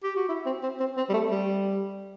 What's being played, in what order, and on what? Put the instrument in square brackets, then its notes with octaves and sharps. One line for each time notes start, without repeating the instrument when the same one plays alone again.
[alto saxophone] G4
F#4
E4
C4
C4
C4
C4
G3
A3
G3